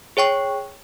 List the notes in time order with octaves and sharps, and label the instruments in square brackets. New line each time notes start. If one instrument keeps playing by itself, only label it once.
[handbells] G#4 C#5 G5 C#6